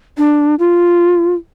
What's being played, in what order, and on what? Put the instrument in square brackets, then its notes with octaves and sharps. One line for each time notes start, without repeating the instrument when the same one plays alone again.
[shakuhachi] D4
F4